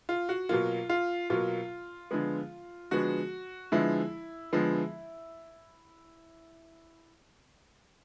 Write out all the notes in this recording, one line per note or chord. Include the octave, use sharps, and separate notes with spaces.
F4
F#4
B2 F#3 A#3 F4
F4
B2 F#3 A#3 F4
D3 F3 G#3 B3
D3 F3 G#3 B3 F#4
D3 F3 G#3 B3 E4
D3 F3 G#3 B3